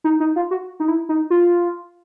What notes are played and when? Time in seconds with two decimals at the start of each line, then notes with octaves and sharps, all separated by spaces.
0.04 D#4
0.20 D#4
0.36 F4
0.51 F#4
0.80 D#4
0.88 E4
1.09 D#4
1.30 F4